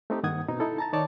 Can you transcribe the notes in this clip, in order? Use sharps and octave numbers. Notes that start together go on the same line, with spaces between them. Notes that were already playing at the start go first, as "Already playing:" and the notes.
A3 C4 D#4 G4
G2 D#3 A#3 F#5 D#6 G#6
B2 C4 D#4
D#4 E4 A4
A5 A#5 A6
D#3 D#4 C#5 D5 A5